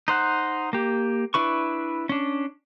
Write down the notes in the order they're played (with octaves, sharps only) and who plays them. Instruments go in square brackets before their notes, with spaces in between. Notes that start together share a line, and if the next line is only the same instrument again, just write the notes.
[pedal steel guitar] D#4 C5 F#5
A#3 G4
D4 E4 B4 C#6
C#4 D4